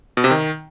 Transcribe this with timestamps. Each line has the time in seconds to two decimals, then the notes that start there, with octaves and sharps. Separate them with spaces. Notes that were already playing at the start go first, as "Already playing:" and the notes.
0.17 B2
0.24 C3
0.31 D#3